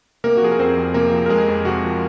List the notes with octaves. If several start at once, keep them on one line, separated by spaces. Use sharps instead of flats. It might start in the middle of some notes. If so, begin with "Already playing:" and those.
C3 A#3 A#4
F#4
F3 G#4
A#4
F2 C4 C5
F2
C3 A#3 A#4
F3
A#4
F2 G#3 G#4
F2
C3 F#4
F3